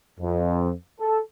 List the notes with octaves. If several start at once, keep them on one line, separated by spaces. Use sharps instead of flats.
F2
A4